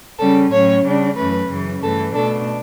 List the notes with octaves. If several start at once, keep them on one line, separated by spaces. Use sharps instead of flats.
C#3 G3 C#4 A4
A2 F#3 C#4 C#5
C#3 G3 D4
F#2 E3 A3 C#4 B4
F#2 C#3 E3
G2 E3 A3 A4
B2 A3 D4 A4